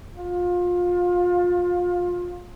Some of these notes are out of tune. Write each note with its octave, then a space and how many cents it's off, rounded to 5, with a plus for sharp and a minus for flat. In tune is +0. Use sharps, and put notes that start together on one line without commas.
F4 +25